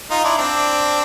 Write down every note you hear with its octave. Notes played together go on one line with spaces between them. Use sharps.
D#4 F4
D4 E4
C4 D4